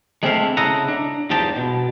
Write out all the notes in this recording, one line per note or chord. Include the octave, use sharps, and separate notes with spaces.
G#3 A3 C4 D4 E4 F5
C#3 E4 A4 D#5 F#5 A#5
D4
E2 G2 F3 D#4 G4 A5
B2